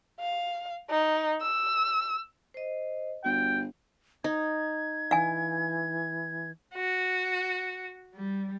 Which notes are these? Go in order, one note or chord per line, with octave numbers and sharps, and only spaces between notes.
F5
D#4
E6
C5 D#5
G1 F#4 G5
D#4 G#6
E3 F5 G#5
F#4
G3